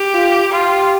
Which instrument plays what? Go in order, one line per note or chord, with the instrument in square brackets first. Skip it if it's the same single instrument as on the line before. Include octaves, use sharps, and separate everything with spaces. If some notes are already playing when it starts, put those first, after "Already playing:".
Already playing: [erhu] G4
[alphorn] F4
[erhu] F4 [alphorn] G4